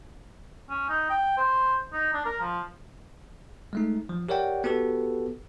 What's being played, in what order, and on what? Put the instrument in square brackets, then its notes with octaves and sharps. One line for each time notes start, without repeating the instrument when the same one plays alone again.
[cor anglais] C#4
D#4
G5
C5
D#4
D4
A#4
F3
[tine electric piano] G#3 A3 D#4
F3
G4 A#4 C#5 D5 F#5 G5
B3 F#4 G4 A4 B4